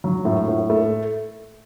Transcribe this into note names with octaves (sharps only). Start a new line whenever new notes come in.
F#3
A2
A2
A3